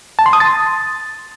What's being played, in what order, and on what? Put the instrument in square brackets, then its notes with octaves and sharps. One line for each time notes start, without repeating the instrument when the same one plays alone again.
[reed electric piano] A5
C6
D#6
A6